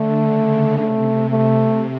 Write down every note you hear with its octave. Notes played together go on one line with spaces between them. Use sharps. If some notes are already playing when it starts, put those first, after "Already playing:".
Already playing: D3 A3
C#3
C3 A3
A3